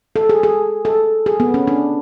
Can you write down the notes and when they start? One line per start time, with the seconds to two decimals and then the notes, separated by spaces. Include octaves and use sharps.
0.16 A4
0.29 G#4
0.43 G#4
0.85 A4
1.26 G#4
1.40 B3
1.54 C#4
1.67 D4